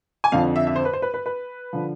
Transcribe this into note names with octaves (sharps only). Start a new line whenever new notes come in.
G#5
F2 D3 F3 F5
E5
E5
C5
B4
C5
B4
B4
B4
D3 F3